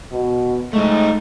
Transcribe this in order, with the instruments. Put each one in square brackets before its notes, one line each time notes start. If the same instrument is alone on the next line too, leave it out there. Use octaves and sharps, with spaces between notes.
[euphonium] B2
[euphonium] G#3 [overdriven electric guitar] A3 D#4